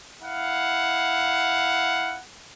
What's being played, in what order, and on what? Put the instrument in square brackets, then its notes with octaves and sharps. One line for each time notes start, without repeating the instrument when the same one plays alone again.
[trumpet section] E4 F5 F#5